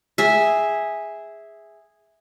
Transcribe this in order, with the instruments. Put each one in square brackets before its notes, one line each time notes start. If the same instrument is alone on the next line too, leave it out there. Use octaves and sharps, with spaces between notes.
[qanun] G#4 E5